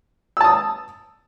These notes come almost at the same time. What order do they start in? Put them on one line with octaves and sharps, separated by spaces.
E6 A5 D#6